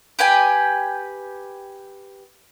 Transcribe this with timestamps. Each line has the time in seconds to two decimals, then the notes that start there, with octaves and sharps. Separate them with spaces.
0.19 G4 B4 G5 G#5